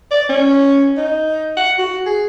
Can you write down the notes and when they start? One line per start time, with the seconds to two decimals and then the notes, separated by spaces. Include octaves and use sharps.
0.11 D5
0.29 C#4
0.97 D#4
1.57 F#5
1.78 F#4
2.06 G#4